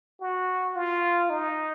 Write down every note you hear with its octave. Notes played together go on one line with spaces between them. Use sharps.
F#4
F4
D#4